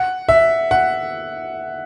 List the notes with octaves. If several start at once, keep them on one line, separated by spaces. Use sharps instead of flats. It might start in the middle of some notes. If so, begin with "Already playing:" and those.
Already playing: F#5
E5
F#5